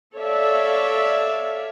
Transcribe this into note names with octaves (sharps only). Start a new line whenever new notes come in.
A4 C#5 D5 E5 F5